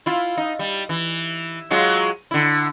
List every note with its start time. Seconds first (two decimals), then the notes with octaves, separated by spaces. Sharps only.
0.06 E4 F4
0.37 D#4
0.59 G3
0.89 E3
1.71 F#3 G#3 F4
2.31 D3 E4